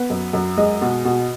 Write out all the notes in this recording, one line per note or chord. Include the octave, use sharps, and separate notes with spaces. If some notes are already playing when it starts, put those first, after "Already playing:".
Already playing: B3 B4
F#2
F#2
G#3 D#5
B2
B2